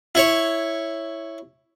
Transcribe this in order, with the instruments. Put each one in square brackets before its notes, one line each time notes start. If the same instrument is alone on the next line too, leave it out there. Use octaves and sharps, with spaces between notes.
[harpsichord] E4 C#5